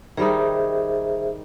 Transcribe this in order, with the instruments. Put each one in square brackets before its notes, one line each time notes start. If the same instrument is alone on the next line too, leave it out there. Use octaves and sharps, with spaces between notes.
[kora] D#3 G3 D#4 [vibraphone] G#4 C5 E5